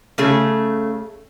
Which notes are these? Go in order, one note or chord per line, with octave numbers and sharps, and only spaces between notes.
C#3 A3 G#4